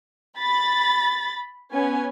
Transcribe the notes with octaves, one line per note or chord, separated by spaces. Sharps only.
B5 A6
B3 C#4 G#5